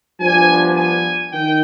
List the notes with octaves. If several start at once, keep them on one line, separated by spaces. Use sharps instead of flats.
G2 F3 B3 D4 G#5
G#5
D#3 G5